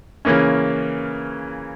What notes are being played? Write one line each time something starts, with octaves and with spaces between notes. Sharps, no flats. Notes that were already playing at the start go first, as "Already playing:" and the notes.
C#3 E3 A#3 C#4